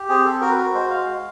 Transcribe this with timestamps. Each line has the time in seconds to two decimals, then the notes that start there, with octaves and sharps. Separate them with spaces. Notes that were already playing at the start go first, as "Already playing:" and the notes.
Already playing: G4
0.09 C4 G#4
0.25 A4
0.41 F#4 A#4
0.51 B4
0.58 A#4
0.74 G#3 C5
0.90 F5
1.07 G#3